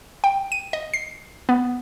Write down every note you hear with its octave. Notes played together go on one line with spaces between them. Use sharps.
G5
D#7
D#5
C7
B3